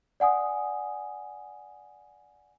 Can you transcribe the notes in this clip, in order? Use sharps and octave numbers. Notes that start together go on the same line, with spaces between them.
D5 F#5 G#5 D#6